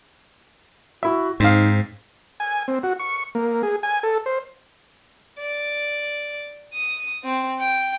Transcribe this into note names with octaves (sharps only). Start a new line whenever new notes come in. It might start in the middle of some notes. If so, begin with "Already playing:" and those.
E4 F#4 E5
G#2 C4 D#4 F5
G#5
C4
F#4
C#6
A#3
G#4
G#5
A4
C5
D5
D#6
C4
G5